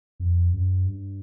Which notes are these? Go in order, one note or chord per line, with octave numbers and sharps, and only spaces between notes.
F2
F#2
G2